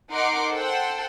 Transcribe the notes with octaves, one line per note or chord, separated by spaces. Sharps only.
D#4 A#4 F#5 C6 D6
A4 C5 F#5 G5 E6